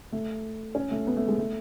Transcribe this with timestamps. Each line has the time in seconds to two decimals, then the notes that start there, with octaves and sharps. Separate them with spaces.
0.12 A3
0.75 C#4
0.91 A3
1.07 B3
1.17 A3
1.28 G#3
1.38 A3